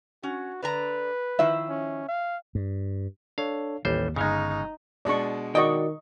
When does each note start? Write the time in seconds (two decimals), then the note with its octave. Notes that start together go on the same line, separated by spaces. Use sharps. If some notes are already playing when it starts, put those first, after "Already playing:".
0.23 C#4 F#4
0.62 D3 B4 D5 A#5
1.39 D#3 F3 E4 E5
1.69 C#4
2.08 F5
2.55 G2
3.38 D4 A4 C#5 F5
3.85 A1 D#2 G3 C5
4.16 G1 C#3 G#3 D#4 C#6 F6
5.05 B2 G#3 D4 D5 C#6
5.55 D#3 F#4 D5 D#5 G5 C#6